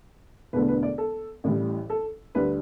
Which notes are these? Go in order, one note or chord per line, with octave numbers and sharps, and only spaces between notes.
E1 E2 D3 A3 B4
B4
D5
A4
A1 A2 E3 G3
A4
D2 D3 G3 B4